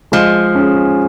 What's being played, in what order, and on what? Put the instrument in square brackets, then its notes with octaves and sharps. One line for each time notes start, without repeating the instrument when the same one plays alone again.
[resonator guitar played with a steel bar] F3 [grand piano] G#3
[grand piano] C#4 G#4